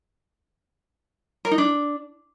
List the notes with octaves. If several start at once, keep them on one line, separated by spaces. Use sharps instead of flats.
A#4
D#4
D4